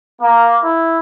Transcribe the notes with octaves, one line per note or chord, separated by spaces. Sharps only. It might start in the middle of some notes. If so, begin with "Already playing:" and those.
A#3
E4